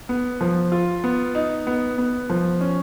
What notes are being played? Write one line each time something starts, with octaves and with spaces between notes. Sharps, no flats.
B3
F3
F4
B3
D#4
B3
B3
F3
C#4